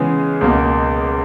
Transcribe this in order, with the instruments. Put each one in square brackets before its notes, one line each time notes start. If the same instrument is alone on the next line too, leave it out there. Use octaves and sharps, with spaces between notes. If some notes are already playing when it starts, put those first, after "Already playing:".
Already playing: [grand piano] C#3 E3 G#3 B3 G#4
C#2 B2 A#3